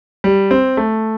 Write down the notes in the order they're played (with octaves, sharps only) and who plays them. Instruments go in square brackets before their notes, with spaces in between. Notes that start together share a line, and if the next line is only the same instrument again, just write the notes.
[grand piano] G3
C4
A3